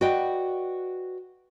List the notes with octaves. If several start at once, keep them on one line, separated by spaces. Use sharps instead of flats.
F#4 B4 D5 D#5 G5